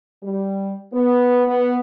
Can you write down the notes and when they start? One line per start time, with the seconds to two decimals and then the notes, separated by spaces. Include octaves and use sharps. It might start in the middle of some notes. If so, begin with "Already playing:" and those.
0.23 G3
0.94 B3
1.47 B3